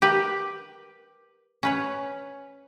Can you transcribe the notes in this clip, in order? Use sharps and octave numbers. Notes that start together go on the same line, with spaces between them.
G4 A#4 B4
C#4 B4 C#5